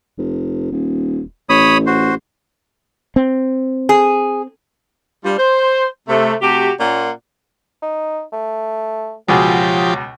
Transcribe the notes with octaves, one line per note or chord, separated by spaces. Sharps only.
F1
D#1
A1 C#5 B5 D#6
F#4 C5
C4
G#4
G3 D4 F4
C5
C3 A3
C3 A3 F#4 G4
A#2 A#3 C#4 F4 D5 F#5
D#4
A3
C#2 B2 F3 F#3 G4 G#4